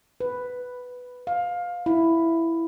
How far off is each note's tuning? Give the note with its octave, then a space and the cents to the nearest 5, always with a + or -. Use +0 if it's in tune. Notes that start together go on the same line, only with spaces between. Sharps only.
B4 +5
F5 +20
E4 +5